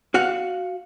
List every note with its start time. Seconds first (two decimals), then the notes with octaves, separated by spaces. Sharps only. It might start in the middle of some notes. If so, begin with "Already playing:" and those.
0.14 F#4 F5 F#5